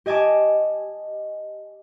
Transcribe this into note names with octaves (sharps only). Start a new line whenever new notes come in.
G4 D#5 G#5 A5 D6